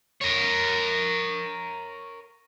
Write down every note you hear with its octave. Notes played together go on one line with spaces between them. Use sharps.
A#4 C#5